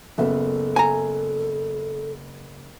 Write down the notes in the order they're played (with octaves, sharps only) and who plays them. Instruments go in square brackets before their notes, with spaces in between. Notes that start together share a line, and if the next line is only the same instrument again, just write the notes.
[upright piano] F#1 B3 E5 [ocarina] A4
[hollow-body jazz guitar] G#5 A#5